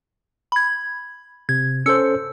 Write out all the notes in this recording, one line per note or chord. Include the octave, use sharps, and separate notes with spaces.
B5 G#6
C3 G#6
C#4 A4 C5 E6 C#7